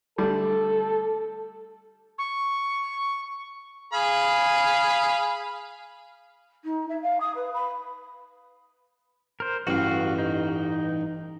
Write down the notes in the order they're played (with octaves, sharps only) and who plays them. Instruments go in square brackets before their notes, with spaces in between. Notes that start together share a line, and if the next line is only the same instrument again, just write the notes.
[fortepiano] D3 G3 A3 [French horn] A4
[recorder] C#6
[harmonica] G#4 F5 B5
[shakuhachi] D#4
E5
F5
D#6
B4
B5
[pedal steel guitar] A#4 C5
[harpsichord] A1 G2 [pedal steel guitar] F#4 F5
[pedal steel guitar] D#4